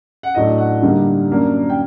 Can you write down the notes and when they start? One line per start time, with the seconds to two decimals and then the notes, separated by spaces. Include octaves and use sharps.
0.23 F#5
0.35 A2 F#3 A3 D4 D#5
0.58 F#5
0.82 G2 D3 G3 A#3 D#4
1.29 F#2 F#3 A#3 D4
1.70 G5